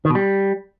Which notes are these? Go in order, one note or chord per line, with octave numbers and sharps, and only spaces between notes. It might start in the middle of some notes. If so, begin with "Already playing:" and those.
D#3
B2
G3